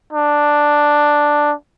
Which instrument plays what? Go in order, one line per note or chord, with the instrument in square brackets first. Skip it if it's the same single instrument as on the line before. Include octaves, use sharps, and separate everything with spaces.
[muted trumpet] D4